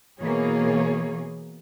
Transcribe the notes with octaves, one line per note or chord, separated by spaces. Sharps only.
B2 E3 A#3 G#4 C#5